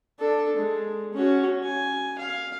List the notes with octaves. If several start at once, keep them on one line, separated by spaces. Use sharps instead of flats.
D4 A4
G#3
C#4 F#4
G#5
F5